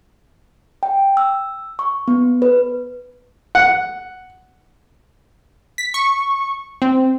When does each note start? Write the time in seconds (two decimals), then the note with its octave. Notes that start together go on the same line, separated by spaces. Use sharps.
0.83 G5
1.17 E6
1.79 C#6
2.08 B3
2.42 B4
3.55 F#5
5.78 B6
5.94 C#6
6.82 C4